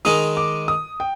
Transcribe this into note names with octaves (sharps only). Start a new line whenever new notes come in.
D#3 G#3 D#4 D#6
D6
D#6
G5